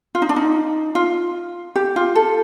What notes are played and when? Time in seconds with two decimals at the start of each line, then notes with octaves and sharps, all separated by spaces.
0.15 F4
0.22 D#4
0.29 D4
0.36 D#4
0.95 F4
1.76 G4
1.96 F4
2.15 A4